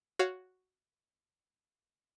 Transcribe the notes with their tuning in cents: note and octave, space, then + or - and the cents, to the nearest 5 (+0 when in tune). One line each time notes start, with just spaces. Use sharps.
F#4 +0 C#5 +5 F5 +0